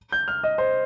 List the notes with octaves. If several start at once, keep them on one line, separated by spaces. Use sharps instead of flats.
G6
F6
D#5
C5